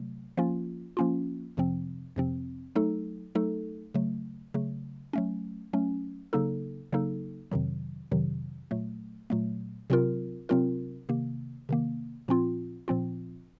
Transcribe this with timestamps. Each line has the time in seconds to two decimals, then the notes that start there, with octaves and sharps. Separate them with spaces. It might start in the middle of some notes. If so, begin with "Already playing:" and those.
Already playing: C3 F#3 A3
0.37 F3 A#3 C#4 F4
0.97 F3 A#3 C#4 F4
1.57 F2 C3 F3 C4
2.16 F2 C3 F3 C4
2.76 F#3 A3 D#4 A4
3.35 F#3 A3 D#4 A4
3.94 C#3 F#3 A3
4.54 C#3 F#3 A3
5.13 F#3 A3 C#4
5.73 F#3 A3 C#4
6.33 C#3 F#3 A#3 D#4 A4
6.93 C#3 F#3 A#3 D#4 A4
7.52 F2 C3 D#3 F#3
8.11 F2 C3 D#3 F#3
8.71 A#2 F#3 A3
9.30 A#2 F#3 A3
9.90 C3 F#3 C4 F4 A#4
10.49 C3 F#3 C4 F4 A#4
11.09 C3 D#3 A#3
11.69 C3 D#3 A#3
12.28 A#2 F3 C4 F4
12.88 A#2 F3 C4 F4